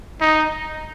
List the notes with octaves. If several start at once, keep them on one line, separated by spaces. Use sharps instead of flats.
D#4